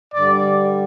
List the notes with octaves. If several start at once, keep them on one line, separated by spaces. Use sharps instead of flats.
G2 D3 G3 D5